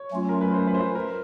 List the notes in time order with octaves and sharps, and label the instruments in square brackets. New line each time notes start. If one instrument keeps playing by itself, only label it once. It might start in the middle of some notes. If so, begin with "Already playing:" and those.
Already playing: [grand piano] C#5
[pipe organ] F#3 A3 C#4 F4
[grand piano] A#4
B4
C5
B4
C5
A#4